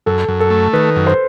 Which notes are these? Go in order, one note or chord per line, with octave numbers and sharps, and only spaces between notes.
F#2 A4
F#2
A4
A3
D#3 B4
F#2
C5